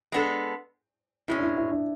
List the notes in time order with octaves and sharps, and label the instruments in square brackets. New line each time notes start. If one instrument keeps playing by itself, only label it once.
[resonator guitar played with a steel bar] G#3 B3 D4 A4
[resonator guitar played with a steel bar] B2 G#3 C#4 [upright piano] E4
[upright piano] D4
E4
E4
D4